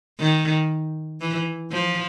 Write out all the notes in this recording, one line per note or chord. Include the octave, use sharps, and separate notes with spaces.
D#3
E3
F3